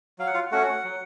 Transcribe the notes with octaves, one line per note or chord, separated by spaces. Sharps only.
F#3 F5
F#5
F4 F5
A3 C#4 F#4 F#5
F#3